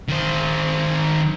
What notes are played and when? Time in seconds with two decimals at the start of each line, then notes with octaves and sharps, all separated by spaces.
0.09 D#3 C5